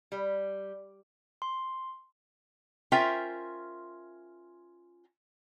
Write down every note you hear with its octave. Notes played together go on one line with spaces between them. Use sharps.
G3
C6
C#4 F4 A#4 C5 E5 G5